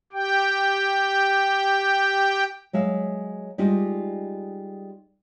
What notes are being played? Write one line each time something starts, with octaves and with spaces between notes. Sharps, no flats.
G4 G5
F#3 G#3 E5 F5
G3 G#3 D#4 F4 G4